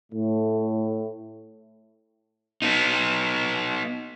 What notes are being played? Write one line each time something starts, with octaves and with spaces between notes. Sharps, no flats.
A2 A3
B3 D#4